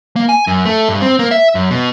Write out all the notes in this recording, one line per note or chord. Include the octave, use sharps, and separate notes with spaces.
A#3
G#5
F#2
A3
G2
C4
A#3
E5
F#2
B2